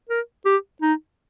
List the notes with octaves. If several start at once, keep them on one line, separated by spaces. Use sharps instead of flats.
A#4
G4
D#4